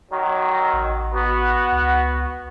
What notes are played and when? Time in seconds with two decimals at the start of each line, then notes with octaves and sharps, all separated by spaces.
0.10 D#3 F#3
0.73 A1
1.14 B3 F#4
1.72 C#2